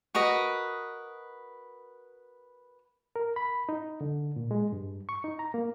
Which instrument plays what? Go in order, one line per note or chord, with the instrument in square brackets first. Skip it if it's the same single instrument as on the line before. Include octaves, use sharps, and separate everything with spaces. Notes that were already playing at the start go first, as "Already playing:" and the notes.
[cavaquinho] F#4 A#4 B4 D#5
[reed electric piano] A#4
B5
D#4
D3
A#2
G#3
G2
C#6
D#4
A#5
A#3